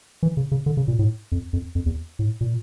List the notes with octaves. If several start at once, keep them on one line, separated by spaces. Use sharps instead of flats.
E3
C#3
C#3
D3
C#3
A#2
A2
F2
F2
F2
E2
A2
A#2